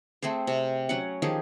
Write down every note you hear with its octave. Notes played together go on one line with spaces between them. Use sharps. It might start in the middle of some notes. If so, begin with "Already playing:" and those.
A3 C4 G#4 C5
C3
F#3 C#4 F#5
D#3 F3 G4 G#4